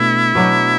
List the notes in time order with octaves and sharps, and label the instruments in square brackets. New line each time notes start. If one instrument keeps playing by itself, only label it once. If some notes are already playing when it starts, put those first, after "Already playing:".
Already playing: [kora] B2 A3 D4 [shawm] E4
[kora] B2 F#3 A3 D4